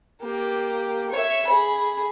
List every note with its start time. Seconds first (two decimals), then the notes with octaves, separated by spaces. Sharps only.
0.21 A#3 G4
1.11 C#5 E5
1.47 G#4 B5